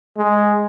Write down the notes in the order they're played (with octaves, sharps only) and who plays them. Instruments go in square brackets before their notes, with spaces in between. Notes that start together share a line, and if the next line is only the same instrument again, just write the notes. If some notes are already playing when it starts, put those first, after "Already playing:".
[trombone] G#3